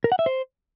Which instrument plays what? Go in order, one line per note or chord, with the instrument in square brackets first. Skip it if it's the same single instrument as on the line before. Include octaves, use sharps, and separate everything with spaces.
[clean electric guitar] A#4
F#5
E5
C5